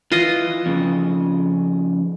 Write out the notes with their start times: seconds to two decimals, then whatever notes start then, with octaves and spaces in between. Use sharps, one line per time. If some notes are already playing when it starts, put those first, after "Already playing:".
0.12 E3 F4 D#5
0.66 F2 C#3